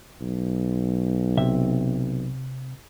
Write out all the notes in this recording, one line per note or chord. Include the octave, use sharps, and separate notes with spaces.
B1
C3 E5